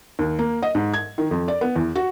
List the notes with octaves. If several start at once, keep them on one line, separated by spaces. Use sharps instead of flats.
D#2
A#3
D#5
G#2
G#6
D#3
F2
D5
B3
E2
F#4